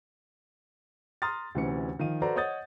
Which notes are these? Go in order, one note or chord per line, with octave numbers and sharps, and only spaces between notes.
A#5 C6 D#6 F6 A6
D2 C3 E3 C#4 C#7
D#3 F3 F5 D#7
F#4 A4 B4 C5 D5 A#5
C#5 D#5 F#5 D#6 G6 A6